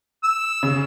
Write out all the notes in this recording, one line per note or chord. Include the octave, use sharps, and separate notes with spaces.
E6
C#3